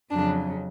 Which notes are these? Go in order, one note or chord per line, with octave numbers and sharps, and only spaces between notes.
F2 C#3 F#3 D4